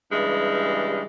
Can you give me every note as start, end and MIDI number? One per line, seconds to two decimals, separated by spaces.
0.12 1.02 43
0.12 1.02 49
0.12 1.02 52
0.12 1.02 55
0.12 1.02 56